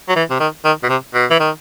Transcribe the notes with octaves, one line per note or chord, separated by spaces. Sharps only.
F#3
E3
C3
D#3
D#3
B2
C3
B2
E3
D#3